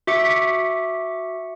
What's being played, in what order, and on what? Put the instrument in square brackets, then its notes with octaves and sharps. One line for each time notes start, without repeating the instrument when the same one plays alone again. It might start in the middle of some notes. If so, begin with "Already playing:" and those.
[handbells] F#4 E5 D6 C#7